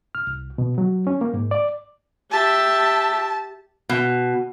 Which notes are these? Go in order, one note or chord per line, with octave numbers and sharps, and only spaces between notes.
F6
C2
B2
F#3
C#4
A#3
G#2
D5
G4 E5 A5
B2